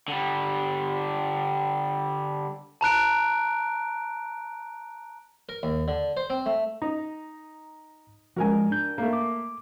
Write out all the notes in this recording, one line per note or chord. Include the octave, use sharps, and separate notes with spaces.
D3 G3
A5 A#5 F#6 D7
A#4
D#2
D3
C5
C4
A3
D#4 A#5
F3 G#3 F#4 A#4 G#5
D4 G6
A3 A#3
D6